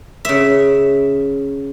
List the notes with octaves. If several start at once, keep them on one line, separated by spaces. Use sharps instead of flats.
C#3 E5